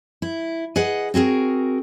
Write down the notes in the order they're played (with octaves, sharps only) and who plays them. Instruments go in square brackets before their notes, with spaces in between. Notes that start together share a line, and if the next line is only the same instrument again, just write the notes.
[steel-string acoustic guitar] E4
G#4 B4 D#5 F#5
C4 F#4 G#4 A#4